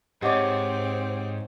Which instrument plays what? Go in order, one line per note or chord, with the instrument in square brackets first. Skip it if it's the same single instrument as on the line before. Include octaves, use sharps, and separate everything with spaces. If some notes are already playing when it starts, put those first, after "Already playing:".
[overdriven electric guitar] G#2 [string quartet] C4 [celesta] G4 F#5 D6 [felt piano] C#5 D#5